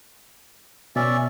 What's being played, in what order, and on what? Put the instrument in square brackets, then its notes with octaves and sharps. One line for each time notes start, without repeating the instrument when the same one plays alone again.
[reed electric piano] B2 [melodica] C#4 D5 E5